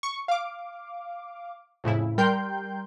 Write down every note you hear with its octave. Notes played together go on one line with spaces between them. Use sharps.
C#6
F5 D6
F2 A2 C#3 E4
G3 A#4 G5 C6 G6